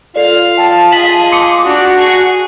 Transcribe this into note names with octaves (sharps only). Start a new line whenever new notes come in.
F4 A4 D5 F5
G5 A5
G#4 D#5 F5 B6 F#7
C6 D6 D#6 C#7
D4 F#4 G4
G#4 C#6